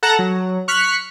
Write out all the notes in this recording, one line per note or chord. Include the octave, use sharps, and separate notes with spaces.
A4 F#5 A5 A#5 A#6
F#3
C#6 F6 F#6 B6 C#7